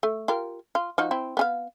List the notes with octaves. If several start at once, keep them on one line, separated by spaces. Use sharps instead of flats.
A3
F4 G4 A#4
F4
F3 D#4 F#4
C4 E4
B3 G#4 F5